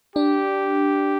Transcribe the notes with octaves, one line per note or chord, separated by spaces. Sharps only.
D4 G4